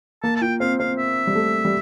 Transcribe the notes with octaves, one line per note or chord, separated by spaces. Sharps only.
A#3 A5
A5
F4 G5
C4 F5
C4 F5
E5
G3
A3
G3